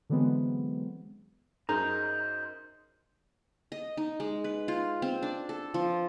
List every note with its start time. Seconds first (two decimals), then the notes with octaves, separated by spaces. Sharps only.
0.10 D3 E3 F#3 G#3 B3 C4
1.69 F#2 D#4 G#4 A#4 C5 A#5
3.72 D#5
3.97 D#4
4.20 G#3
4.44 B4
4.68 F4
5.02 C4
5.23 D4
5.49 A4
5.74 F3